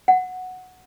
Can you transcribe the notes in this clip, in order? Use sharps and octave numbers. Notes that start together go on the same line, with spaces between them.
F#5